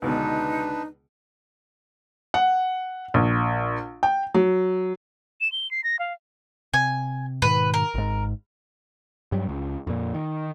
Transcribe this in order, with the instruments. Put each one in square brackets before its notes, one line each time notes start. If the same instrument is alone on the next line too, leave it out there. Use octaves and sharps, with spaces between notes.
[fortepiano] C#2 B2 D3 [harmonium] D4 B4 [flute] D#4
[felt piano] F#5
A#1
G5
F#3
[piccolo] E7
G7
C7
A#6
F5
[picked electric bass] C3 [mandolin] G#5
[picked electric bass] G#2 B2 D#3 [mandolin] B4
[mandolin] A#4
[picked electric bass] G#1 G#2
G2 F#3 G3
C#2
F2 A#2
D#3